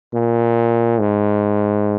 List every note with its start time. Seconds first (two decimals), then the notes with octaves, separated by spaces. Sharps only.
0.14 A#2
1.00 G#2